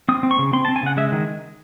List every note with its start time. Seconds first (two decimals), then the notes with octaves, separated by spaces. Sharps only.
0.09 C4 D#6
0.23 C4
0.31 C#6
0.39 C#3
0.53 C4 C6
0.65 A5
0.68 C4
0.76 G#5
0.83 C#3 F#5
0.97 G#3 E5
1.12 D#3